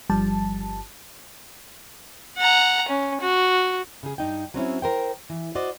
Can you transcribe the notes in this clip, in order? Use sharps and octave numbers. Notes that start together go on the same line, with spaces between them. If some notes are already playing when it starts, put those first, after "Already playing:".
G1 F3 G3 A5
F#5 A#5
C#4
F#4
C#3 G#4
G2 D#4 G5
F#3 C4 C#4 E4
A#4 C5 G5
E3
F#4 C5 D5 D#5